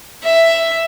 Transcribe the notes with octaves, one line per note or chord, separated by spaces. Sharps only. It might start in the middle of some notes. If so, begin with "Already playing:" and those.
E5